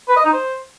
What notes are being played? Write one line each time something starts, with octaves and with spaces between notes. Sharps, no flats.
B4
D#5
D#4
C5